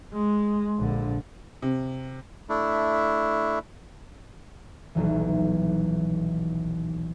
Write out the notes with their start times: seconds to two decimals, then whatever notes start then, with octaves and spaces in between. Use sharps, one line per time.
0.13 G#3
0.79 A#1 D3
1.62 C3
2.49 A3 D4 E4
4.95 D#1 B1 E3